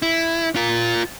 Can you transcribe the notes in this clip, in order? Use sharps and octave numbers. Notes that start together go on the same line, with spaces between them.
E4
F4 A#4